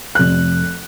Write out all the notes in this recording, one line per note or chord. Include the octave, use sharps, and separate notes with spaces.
F1 F#6